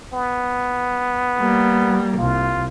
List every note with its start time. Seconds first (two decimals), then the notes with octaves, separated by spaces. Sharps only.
0.14 B3
1.39 G3 A#3
2.18 C2 F4